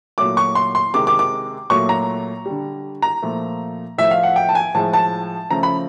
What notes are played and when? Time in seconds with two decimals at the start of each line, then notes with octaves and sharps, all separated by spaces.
0.18 A#2 F#3 A3 D6
0.37 C#6
0.55 C6
0.75 C6
0.94 C3 D#3 G#3 D6
1.07 D6
1.19 D6
1.70 A#2 F#3 A3 C#6
1.89 A#5
2.46 D3 G3
3.02 A#5
3.22 A#2 F3 A3
3.98 A2 F3 A3 E5
4.11 F5
4.23 F#5
4.36 G5
4.49 A5
4.55 G#5
4.74 A2 F3 G#3 A5
4.93 A5
5.50 C#3 F3 A3 A#5
5.63 B5